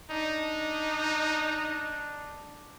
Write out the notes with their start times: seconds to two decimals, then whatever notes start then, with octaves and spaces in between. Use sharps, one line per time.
0.10 D4 D#4